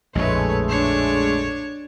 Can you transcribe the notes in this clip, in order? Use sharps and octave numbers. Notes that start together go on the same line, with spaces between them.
A#1 F2 A2 G#3 A3 B4 C#5
D4 C#5